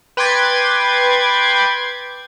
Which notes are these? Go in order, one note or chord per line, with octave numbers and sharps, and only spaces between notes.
B4 G5 C6 D6 G#6 A6